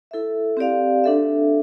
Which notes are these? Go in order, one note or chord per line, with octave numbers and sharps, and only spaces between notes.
E4 A4 E5
C4 G4 D5 F5
D4 A4 E5